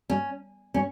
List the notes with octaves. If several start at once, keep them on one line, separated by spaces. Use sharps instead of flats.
C#4
C#4